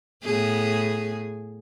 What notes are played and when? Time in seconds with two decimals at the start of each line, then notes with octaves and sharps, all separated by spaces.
0.23 A2 B3 G#4